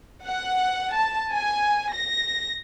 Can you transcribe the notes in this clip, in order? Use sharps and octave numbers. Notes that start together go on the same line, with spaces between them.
F#5
A5
G#5
A#6